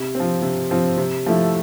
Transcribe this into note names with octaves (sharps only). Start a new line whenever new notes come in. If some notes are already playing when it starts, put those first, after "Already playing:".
Already playing: C3
C4
F3
C3
F3 C4
C3
F3 A3 E4